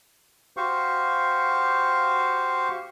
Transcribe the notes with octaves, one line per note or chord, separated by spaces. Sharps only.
F#4 G4 C5 F5 C#6